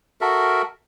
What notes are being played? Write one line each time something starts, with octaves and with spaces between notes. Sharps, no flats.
F#4 A4 A#4 E5